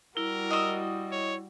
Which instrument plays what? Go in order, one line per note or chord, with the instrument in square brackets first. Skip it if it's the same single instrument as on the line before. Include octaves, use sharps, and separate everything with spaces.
[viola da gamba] G3 F#4 [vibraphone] E4 [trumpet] A#4
[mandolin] D#5 E6
[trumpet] C#5